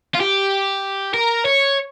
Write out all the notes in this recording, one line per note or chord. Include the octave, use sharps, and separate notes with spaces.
F4
G4
A#4
C#5